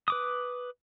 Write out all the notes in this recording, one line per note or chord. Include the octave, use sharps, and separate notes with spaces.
B4 D6 D#6